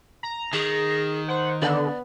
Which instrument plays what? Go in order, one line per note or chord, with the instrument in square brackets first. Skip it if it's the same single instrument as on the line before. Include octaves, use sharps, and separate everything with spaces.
[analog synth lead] A#5
[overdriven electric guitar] D#3 [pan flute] G#4
[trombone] C5 [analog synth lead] F#5
[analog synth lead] D3 [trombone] B3 [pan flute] D5